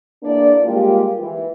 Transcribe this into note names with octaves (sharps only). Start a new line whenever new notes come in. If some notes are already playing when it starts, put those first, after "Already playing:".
E2 A#3 D4 D5
G3 G#3 A#3 F4 G4
E3